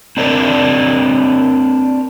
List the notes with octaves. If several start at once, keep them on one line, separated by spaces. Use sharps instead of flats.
C4 D4 A#4 B4 D5